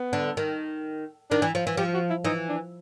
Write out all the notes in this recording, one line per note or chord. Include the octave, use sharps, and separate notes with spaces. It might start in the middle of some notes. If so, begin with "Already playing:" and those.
Already playing: B3
D3
D#3
D#3 D4
E3
F3
E3
F3 G4
F#4
E4
E3 D#4
D4